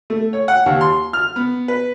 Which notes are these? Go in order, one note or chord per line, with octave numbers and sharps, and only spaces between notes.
A3
C#5
F#5
D#2
C6
F6
B3
B4